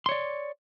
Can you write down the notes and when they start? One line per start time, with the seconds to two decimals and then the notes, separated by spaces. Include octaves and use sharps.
0.06 C6
0.09 C#5
0.12 D5